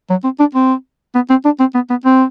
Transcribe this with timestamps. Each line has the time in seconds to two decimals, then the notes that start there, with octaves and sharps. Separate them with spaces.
0.10 F#3
0.24 C4
0.40 D4
0.55 C4
1.15 B3
1.30 C4
1.45 D4
1.60 C4
1.75 B3
1.90 B3
2.05 C4